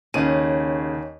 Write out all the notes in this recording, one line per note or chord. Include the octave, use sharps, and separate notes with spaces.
D#2 C#3 C#5 D#5 G#5 D#7